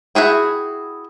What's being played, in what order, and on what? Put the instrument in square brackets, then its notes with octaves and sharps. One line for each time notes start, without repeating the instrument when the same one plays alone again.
[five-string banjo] E4 F#4 G#4 G5